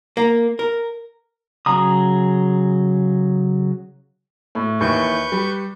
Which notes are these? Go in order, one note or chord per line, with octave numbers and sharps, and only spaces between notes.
A#3
A#4
C#3 F#3 G#4 A#5 D#6
A2
D#2 E3 B4 C#6 G6
G3